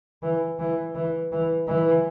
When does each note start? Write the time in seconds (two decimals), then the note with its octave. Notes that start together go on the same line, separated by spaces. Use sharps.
0.23 E3
0.59 E3
0.95 E3
1.32 E3
1.68 E3